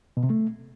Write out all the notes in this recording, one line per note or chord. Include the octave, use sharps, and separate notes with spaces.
B2
C3
A3